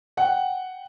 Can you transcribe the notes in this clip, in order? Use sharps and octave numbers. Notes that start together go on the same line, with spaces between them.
F#5 G5